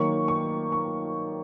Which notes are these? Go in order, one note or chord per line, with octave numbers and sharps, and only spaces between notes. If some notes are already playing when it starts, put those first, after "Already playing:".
Already playing: D#3 F#3 A#3 C#6
C#6
C#6